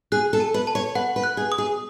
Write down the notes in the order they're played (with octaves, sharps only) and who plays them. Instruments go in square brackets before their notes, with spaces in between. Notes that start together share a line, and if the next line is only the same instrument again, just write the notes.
[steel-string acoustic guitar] G#4 [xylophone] F#6
[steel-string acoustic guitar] A4
[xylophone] A5
[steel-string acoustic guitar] B4
[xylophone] A5
[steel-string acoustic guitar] C#5
[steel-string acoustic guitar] B4 [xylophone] F#5
[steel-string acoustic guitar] B4
[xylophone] F#6
[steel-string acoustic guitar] G#4
[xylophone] D#6
[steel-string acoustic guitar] G#4